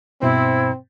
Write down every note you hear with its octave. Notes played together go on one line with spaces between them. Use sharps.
G2 B2 C4 E4 C5